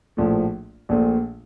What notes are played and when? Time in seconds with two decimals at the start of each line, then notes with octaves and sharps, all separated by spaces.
0.17 A#1 A2 F3 A3
0.89 A#1 A#2 A3